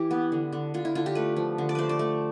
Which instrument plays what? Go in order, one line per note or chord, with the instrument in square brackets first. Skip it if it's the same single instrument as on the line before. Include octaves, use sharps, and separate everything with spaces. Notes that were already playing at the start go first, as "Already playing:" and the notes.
Already playing: [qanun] E3 E4 G4
B3
D3
D3
D3 F4
E4
D3 F4
G4
A3 B4
F3
D3
D5
A3 B4 C5
D5
A3